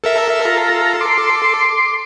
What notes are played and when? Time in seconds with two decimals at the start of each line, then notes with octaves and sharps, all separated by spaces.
0.04 A4 A#4 E5
0.45 F4 A4 A#5
1.01 C6 D6